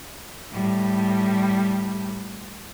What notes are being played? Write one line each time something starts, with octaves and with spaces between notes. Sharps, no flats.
A2 G3